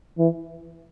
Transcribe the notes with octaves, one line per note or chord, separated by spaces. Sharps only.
E3